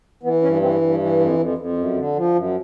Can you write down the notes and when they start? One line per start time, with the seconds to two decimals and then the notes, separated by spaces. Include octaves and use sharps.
0.23 E3 B3
0.42 G2 C#4
0.61 E3 C4
0.81 G2
1.00 E3
1.19 F2
1.39 F2
1.58 F2
1.78 F#2
1.96 D3
2.16 F3
2.35 F#2